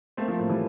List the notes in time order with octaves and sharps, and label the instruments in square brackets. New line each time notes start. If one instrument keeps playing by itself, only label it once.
[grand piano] A3 C4 [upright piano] A#3
[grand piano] F3 A3
[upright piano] A2
[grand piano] E3 G3